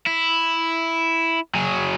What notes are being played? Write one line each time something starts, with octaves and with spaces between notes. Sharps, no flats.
E4
F#3 G#4